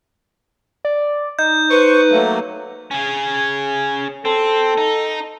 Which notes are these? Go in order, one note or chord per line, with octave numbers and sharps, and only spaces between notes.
D5
D#4 G6
B4 C5 C#6
F#3 A3 A#3
C#4 G#4
C4 A4
D#4